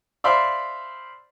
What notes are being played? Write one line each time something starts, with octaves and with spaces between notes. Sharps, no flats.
C5 D5 E5 F5 B5 C6